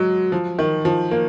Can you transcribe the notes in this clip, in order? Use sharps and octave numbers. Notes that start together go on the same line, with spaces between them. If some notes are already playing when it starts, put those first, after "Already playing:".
Already playing: F#3 G#3
F3
D#3
F3
A#3